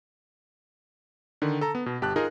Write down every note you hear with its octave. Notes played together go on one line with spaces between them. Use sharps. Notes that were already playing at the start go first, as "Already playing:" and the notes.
D3 D#3
A4 A#5
B3
B2
G1 G4 A5 F#6
D#4 F4 G#4 A#4